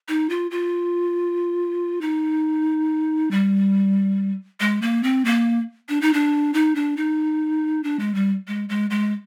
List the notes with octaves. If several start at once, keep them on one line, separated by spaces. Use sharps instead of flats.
D#4
F4
F4
D#4
G3
G#3
A#3
C4
A#3
D4
D#4
D4
D#4
D4
D#4
D4
G#3
G3
G#3
G#3
G#3